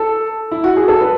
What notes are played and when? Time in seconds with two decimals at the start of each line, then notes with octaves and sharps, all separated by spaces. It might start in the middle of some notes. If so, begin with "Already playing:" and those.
Already playing: A4
0.51 E4
0.64 F#4
0.77 G#4
0.88 A4
1.01 B4